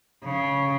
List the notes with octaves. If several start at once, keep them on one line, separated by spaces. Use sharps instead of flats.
C#3